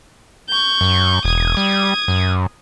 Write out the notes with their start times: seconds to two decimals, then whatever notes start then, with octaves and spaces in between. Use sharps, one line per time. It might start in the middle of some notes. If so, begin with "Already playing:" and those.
0.49 C#6 G6
0.81 F#2
1.25 E1 D#6 G#6
1.57 G3
2.08 F#2